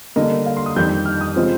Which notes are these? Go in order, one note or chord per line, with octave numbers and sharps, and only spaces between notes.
D3 G3 A#3 D#5
F5
C6
D#6
F2 D#3 G3 G6
F6
D#6
C3 F3 G#3 C4 F4